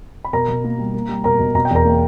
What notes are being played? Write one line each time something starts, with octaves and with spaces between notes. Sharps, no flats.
B5
B2 A#4 A#5
B2
A#3
G3
A#3
G3
B2 A#4 A#5
B2
B2 A#5
G5
E2 A#4 A#5
A#3